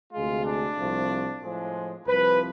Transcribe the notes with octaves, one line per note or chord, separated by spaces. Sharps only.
D2 C3 G#3 F4
D4
C2 C3 F3 A3
A2 F3 G#3
C2 C3 F3 B4